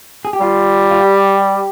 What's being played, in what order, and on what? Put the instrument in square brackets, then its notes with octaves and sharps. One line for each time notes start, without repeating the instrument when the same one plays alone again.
[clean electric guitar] G#4
G4
[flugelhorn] G3 [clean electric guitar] F4
[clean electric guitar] F4
G4